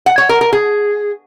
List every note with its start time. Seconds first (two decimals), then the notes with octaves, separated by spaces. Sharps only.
0.06 F#5
0.18 C#5
0.29 A#4
0.41 A#4
0.52 G#4